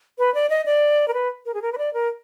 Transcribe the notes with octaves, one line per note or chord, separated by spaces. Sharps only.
B4
D5
D#5
D5
A#4
B4
A#4
G#4
A#4
B4
D5
A#4